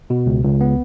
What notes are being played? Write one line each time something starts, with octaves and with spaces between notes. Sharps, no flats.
B2
C#2
C#2
B3